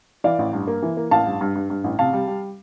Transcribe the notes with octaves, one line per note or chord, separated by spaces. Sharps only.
E3 D5 F5
A1
G2
A#3
E3
A#3
A1 F5 A5
G2
G2
G2
G2
A1
C3 F5 A5
G3
G3